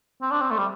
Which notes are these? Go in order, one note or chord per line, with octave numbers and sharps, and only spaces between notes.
C4
D4
C4
A3
G3